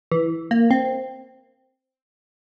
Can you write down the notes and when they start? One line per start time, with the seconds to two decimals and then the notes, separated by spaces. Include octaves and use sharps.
0.11 E3
0.51 A#3
0.71 C4